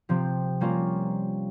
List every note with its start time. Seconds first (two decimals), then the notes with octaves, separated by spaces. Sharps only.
0.09 C3 F3 C4
0.61 G3 A#3 C#4 F4 A#4